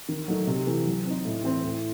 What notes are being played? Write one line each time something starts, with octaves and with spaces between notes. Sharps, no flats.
D#3
F#3 A3 D#4
C3
E3 A3
F#3
C4 D#4
A2
E3 C4
A2